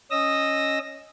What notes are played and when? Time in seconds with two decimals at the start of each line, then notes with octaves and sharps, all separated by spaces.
0.11 C#4 D#5 D#6 E6 A#6